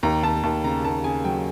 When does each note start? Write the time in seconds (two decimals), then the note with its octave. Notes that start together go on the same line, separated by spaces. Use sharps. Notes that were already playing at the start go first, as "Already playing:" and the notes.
0.03 D#2 A#5
0.23 D#2 A5
0.43 D#2 A5
0.64 C#3 A#5
0.84 D#2 A5
1.04 C#3 G#5
1.24 F#3 G5